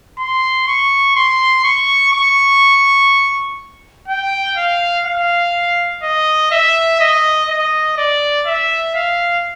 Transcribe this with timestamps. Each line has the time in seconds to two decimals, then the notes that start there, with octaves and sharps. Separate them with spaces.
0.19 C6
0.68 C#6
1.16 C6
1.64 C#6
2.13 C#6
4.08 G5
4.57 F5
5.06 F5
6.03 D#5
6.52 E5
7.00 D#5
7.49 D#5
7.97 D5
8.47 E5
8.95 F5